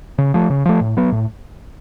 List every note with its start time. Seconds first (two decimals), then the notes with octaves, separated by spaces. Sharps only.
0.18 C#3
0.34 F3 A3
0.50 C#3
0.66 F3 A3
0.81 A2
0.97 F#3 B3
1.12 A2